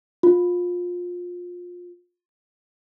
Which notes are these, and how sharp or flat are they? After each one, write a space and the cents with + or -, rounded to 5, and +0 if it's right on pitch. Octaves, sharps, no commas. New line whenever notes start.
F4 +25